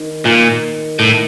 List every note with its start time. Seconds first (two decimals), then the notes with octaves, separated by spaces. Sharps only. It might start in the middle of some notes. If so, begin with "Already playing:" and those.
Already playing: D#3
0.25 A#2
0.99 A2